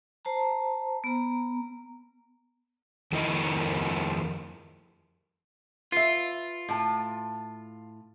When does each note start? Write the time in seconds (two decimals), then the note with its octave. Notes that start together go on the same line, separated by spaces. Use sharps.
0.25 C5 A5 A#5
1.04 B3 A#5
3.12 F2 D#3 E4 A#4 D#5
5.92 F4 B4 E5
6.69 A2 A5